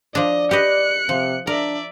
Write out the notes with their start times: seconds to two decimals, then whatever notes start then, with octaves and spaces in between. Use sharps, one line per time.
0.15 F3 D4 D5 D#5
0.51 G4 B4 D#5 F#6 C#7
1.09 C3 F3
1.47 D4 A#4 D5 E5